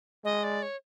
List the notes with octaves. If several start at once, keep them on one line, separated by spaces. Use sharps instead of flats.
G#3 D#5
D5
C#5